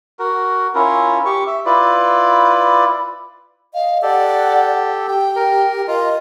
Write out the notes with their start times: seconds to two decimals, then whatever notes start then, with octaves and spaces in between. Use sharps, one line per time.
0.19 F#4 A#4
0.75 C#4 E4 F4 A#4
1.25 G4 C#6
1.47 E5
1.66 E4 F4 B4 D5
3.74 D#5 F5
4.03 G4 A4 D5 F#5
5.08 G4 G5
5.36 A#4
5.88 F4 A#4 D#5